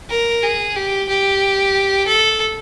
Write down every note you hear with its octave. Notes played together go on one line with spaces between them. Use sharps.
A#4
G#4
G4
G4
A4